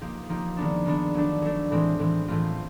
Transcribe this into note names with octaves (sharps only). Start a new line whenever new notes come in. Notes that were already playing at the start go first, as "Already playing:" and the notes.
F3 A#3 D#4 G4
F3 A#3 D#4 G4
D#3 G#3 B3 D4
D#3 G#3 B3 D4
F#3 A3 D4
F#3 A3 D4
A2 E3 G#3 C4
A2 E3 G#3 C4
A2 E3 A3 C4 F4